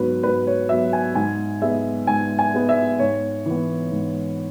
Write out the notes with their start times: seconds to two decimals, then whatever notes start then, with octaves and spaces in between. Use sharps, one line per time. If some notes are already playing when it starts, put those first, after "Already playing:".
Already playing: G#2 F#3 B3 B4
0.23 G#2 B4
0.47 C#5
0.69 F#3 B3 E5
0.93 G#5
1.15 G#2 G#5
1.62 G#3 B3 E5
2.07 G#2 G#5
2.39 G#5
2.54 G#3 B3
2.69 E5
2.99 G#2 C#5
3.46 E3 B3
3.91 G#2